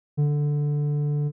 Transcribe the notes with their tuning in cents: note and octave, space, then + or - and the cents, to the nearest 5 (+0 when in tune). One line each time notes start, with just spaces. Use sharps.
D3 +0